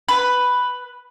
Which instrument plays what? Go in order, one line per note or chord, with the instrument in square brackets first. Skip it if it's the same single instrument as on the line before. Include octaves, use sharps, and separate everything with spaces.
[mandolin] B4